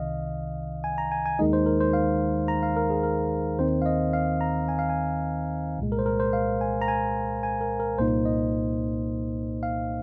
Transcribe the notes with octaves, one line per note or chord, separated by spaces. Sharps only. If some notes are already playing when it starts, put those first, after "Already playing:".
Already playing: C2 C3 D#3 D#5 F5
G#5
A#5
G#5
G#5
D#2 D#3 G#3 D#4 D#5
C5
A#4
C5
F5
A#5
F5
A#4
G#4
A#4
D#2 D#3 C4 D#4 C5
F5
D#5
F5
A#5
G#5
F5
G#5
C2 A#2 G#3
A#4
C5
A#4
C5
F5
G#5
A#5
G#5
G#5
A#4
A#4
C2 A#2 A#3 D#4 C5
D#5
F5